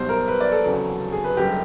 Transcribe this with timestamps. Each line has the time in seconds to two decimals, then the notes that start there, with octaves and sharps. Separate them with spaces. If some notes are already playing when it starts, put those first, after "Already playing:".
Already playing: B1 B2 G3 C5
0.09 A#4
0.28 B4
0.40 D5
0.52 A4
0.64 F1 E2 C#3 F#3
1.12 G#4
1.24 B4
1.37 F#1 F#2 D3 G3 G4